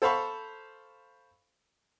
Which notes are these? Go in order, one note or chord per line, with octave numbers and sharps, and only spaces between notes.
A4 C5 F5 B5 C#6